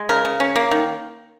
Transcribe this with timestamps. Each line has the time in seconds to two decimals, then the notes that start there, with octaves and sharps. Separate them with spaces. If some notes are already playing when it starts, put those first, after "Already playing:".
Already playing: G#3
0.09 C#3 A#4
0.25 C#3
0.40 C#4
0.56 A#3
0.71 D#3